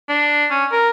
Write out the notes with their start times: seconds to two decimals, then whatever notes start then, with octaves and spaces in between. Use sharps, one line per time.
0.09 D4
0.50 C#4
0.72 A#4